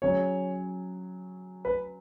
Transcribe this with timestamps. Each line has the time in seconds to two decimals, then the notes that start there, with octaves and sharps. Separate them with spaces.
0.02 F#3 C#4 G#4 C#5
1.65 B4